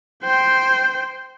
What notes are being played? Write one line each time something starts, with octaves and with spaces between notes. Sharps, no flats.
C5 G5